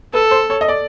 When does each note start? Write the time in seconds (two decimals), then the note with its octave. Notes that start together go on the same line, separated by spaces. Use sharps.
0.13 A4 B4
0.31 C5
0.50 C#5
0.61 D#5
0.68 D5